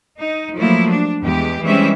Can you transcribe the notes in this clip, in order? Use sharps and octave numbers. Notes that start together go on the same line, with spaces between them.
D#4
F3 F#3 A3 A#3 E4
D4
E2 G#3 G4
E3 G3 G#3 C4 C#4 E5